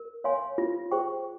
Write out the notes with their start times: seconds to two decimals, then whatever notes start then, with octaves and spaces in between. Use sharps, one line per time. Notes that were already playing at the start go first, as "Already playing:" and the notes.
Already playing: A#4
0.24 C#5 F5 G#5 C6
0.58 F4
0.91 G#4 C5 G5 C#6